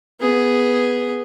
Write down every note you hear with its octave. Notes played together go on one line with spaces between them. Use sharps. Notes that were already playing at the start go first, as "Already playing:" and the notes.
B3 G#4